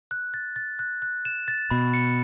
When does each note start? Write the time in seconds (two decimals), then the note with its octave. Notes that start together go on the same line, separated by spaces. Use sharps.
0.11 F#6
0.34 A6
0.56 A6
0.79 F#6
1.02 F#6
1.25 E7
1.48 A6
1.71 B2 B5
1.94 C#7